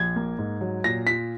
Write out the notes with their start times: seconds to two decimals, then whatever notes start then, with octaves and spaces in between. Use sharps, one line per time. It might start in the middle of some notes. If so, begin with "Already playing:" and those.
Already playing: A#1 G#6
0.16 A#3
0.38 G#2
0.61 F#3
0.84 A#2 A#6
1.06 F4 B6